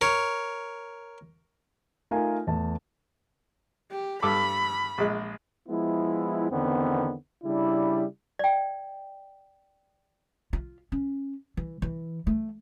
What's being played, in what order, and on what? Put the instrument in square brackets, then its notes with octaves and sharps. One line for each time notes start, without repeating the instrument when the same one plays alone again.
[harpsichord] A#4 C#5
[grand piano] A3 D#4 F4 A#4 F5 G#5
E2 A3 A5
[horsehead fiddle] G4
[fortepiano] G2 A4 D6 [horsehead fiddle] B5
[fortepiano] A#1 G#3
[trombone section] F3 G#3 B3 E4
E2 D3 D#3 B3 C4
C#3 G3 D4 E4
[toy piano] D5 G5
[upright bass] F4
C#4
E3
E3
A3